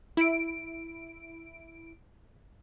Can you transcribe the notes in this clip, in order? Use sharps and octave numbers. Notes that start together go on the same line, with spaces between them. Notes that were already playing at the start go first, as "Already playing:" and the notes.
E4 D7